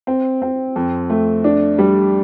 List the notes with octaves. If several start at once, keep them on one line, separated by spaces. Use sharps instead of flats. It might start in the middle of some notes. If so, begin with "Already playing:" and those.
C4
C4
F2
A3
D4
G3